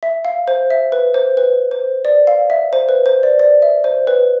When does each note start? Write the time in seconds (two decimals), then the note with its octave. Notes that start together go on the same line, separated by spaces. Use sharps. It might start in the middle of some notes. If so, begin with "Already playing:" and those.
0.03 E5
0.25 F5
0.48 C5
0.70 E5
0.92 B4
1.14 C5
1.37 B4
1.71 C5
2.05 D5
2.27 F5
2.50 E5
2.73 C5
2.89 B4
3.06 C5
3.23 D5
3.39 D5
3.62 E5
3.84 C5
4.07 B4